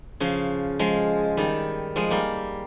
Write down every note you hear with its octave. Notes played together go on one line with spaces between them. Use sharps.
C#3 F3
F3 G#3
D#3 G3
F3 G#3
G3 A#3